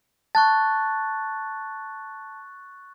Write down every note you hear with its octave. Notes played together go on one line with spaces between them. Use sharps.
A5 C#6 F#6 A6